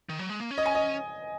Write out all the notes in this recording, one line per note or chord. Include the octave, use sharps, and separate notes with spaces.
D#3
F#3
G#3
A#3
C#4
D#5
G#5
D#5